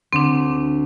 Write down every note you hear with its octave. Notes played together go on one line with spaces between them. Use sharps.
D2 C4 D4